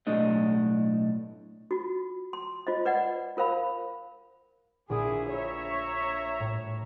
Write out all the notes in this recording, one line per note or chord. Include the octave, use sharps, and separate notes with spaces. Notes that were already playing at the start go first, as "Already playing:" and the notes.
B1 A2 A3 D4 D#5
F4 F#4
C6
F4 C5 D#5
B4 D5 D#5 F#5
F4 A#4 C5 F5 B5
A#1 D4 E4 G#4 D#6
C#5 E5 A#5
A2